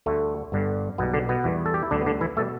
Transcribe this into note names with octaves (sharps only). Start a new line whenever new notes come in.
D2 D3 G3 A3
G1 G2 D3 G3
B1 B2 G3 B3
D3 D4
B2 B3
E2 E3 G3
A4
G4
E4
D2 D3 G3 D4
B3
D3 D4
E3 E4
B2 G3 A3 A4